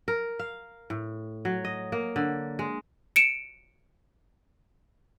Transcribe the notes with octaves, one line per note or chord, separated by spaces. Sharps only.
A#4
F5
A2
F#3
D#5
A#3
D3
G#3
C#7 D7 E7